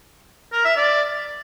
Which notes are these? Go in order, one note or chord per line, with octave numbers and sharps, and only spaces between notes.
A#4
E5
D5